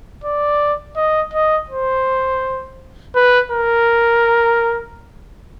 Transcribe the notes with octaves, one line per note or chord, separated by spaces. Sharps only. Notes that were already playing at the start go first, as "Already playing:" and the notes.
D5
D#5
D#5
C5
B4
A#4